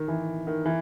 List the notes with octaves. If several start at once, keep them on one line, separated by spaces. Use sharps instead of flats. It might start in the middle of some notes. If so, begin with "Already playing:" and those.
Already playing: D#3
E3
D#3
E3